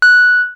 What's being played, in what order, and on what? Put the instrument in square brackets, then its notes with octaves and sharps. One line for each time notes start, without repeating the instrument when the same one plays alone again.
[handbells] F#6